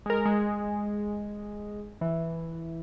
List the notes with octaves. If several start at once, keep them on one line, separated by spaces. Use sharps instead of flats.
G#3 A#4
G#3
E3